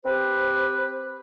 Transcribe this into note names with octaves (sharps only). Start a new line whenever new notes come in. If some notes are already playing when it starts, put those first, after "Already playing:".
C4 G4 B4 C5